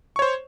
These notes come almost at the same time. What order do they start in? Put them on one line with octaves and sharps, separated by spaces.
C#6 C#5 C5